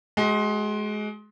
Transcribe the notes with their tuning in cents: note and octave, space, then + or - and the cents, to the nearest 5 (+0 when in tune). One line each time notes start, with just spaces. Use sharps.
G#3 +25 G4 -40